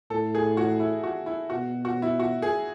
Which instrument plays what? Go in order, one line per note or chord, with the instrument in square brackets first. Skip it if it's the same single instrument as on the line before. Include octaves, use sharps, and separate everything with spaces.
[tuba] A2 [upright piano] A4
[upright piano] G#4
F#4
E4
F#4
E4
[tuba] B2 [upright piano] F#4
[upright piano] F#4
E4
F#4
G#4